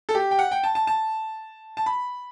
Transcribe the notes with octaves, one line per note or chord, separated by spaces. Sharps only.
A4
G4
G5
F#5
G5
A5
A5
A5
A5
B5